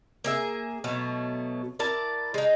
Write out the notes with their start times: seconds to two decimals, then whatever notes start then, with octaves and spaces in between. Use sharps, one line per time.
0.24 A#3 G#4 E5
0.84 B2 F#3 A3
1.79 E4 A#4 D5 A5
2.34 G#3 D#4